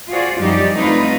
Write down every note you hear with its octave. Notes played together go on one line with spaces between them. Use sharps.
F4 F#4 G#4 C5 D5
F#2 F3 G3 D#4 G4 D5
D3 A3 C4 D#4 F4 B4